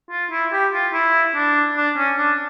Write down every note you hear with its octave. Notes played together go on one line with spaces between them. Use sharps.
F4
E4
G4
F4
E4
D4
D4
C#4
D4